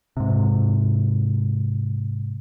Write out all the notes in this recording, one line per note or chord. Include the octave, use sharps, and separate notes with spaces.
G#2 C3